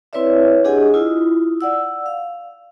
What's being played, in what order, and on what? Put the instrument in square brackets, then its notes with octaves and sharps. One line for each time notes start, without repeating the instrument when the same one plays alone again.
[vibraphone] C4 E4 B4 C#5 D5 E5
D4 G4 G#4 D#5 F#5 G#5
E4 F4 D#6
D5 F#5 E6
F5